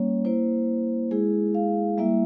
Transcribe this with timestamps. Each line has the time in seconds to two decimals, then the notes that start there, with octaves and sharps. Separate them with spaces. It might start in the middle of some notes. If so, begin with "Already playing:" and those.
Already playing: G3 A#3 C#4 C#5
0.25 A#3 E4 C5
1.11 G#3 E4 G#4
1.55 F5
1.98 G3 A#3 E4 E5